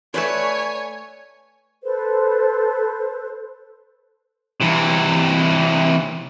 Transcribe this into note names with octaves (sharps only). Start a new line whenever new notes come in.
A3 B4 C#5 D5 G#5
A4 B4 C5
C3 E3